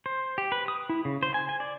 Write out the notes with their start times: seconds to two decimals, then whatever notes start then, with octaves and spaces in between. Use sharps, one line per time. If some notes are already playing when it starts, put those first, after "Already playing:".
0.06 C5
0.38 G4
0.52 B4
0.68 D#6
0.89 E4
1.05 C#3
1.23 C5
1.34 G#5
1.49 G#5
1.60 D5